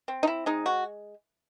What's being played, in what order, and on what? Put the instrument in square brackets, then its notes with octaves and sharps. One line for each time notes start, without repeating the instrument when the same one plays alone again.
[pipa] C4
D#4
E4
G#3 D#4
F#4